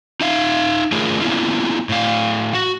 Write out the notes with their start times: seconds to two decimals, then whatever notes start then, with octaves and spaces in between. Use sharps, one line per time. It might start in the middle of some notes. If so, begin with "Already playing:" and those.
0.21 D#4 E5 F5
0.92 A3 F4 G#4 A#4
1.21 A#3 B3 C#4 E4 F4
1.89 A2 F5
2.55 F#4